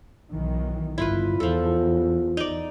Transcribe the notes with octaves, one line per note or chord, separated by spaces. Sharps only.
B1 D#3 E3
G1 E4 F4 B4
E2 F3 A4
D#4 D5